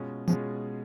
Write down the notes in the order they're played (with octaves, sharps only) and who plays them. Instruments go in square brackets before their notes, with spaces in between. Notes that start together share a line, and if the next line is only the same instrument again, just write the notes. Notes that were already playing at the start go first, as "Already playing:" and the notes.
Already playing: [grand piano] B2 G#3 C#4 F4 G#4
[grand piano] B2 G#3 C#4 F4 G#4 [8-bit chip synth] F3